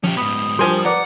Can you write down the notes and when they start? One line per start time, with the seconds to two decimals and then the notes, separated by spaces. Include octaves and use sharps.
0.04 F3 C#4 G4
0.17 G#2 B3 B5 D#6
0.59 F3 G3 G4 A#4 C5 G#5 C6
0.85 B4 D5 F#5 A#5 D6